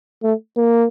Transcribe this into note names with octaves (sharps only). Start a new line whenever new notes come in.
A3
A#3